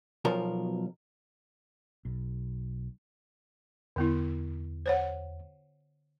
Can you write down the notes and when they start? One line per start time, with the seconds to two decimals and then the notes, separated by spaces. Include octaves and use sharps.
0.25 B1 B2 F3 A#4
2.05 B1
3.96 E2 D3 B3 E4
4.86 C5 C#5 F#5